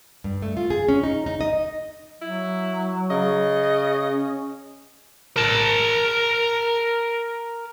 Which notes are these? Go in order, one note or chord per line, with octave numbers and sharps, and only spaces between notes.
G2
A3
F4
G#4
C#4
D#4
D#4
D#5
F#3 E4
C#3 D#5
C#4
A#4 A5